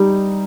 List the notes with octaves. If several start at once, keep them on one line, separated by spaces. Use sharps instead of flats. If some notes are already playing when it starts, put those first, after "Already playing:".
Already playing: G3 D#4